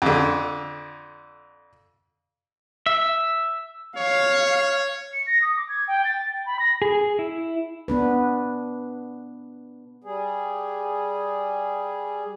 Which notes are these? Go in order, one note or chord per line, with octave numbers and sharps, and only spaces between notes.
F2 D3
E5
C#5 F5
C#7
A#6
D#6
D6
G#6
G5
A6
G5
B5
A#6
G#4
E4
B3 D4 B4
G3 G#4